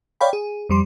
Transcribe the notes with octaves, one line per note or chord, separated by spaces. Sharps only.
C#5 D5 F5 G5 B5
G#4
F2 G3 C6